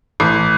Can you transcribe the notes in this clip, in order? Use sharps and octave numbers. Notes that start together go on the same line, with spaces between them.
A1